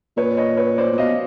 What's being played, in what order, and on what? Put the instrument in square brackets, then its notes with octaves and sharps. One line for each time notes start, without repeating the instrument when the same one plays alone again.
[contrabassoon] A#2 [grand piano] B4 C#5
[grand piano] C#5 D#5
B4 C#5
C5 D5
[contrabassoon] A#2
[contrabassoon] B2 [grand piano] D#5 F5